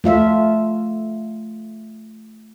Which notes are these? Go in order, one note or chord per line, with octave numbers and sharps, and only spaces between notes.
A3 F4 E5